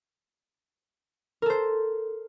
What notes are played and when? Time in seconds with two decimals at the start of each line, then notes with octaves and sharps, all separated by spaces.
1.42 A#4
1.46 A4
1.50 C5